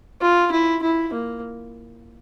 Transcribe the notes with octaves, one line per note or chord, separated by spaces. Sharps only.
F4
E4
E4
A#3